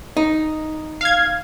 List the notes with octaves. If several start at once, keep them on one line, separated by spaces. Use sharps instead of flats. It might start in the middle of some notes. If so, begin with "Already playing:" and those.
D#4
F5 G#6